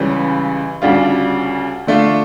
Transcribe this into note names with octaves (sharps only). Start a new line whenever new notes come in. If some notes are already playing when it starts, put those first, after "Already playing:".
Already playing: C#2 C#3 E3 G3 C#4
D2 C#3 G3 D4 F4
D3 A3 D4 F4